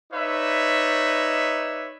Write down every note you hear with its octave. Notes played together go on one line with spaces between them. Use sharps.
D#4 B4 C#5 D5 E5